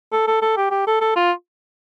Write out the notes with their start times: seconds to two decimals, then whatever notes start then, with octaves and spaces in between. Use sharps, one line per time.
0.12 A4
0.27 A4
0.42 A4
0.57 G4
0.71 G4
0.87 A4
1.01 A4
1.16 F4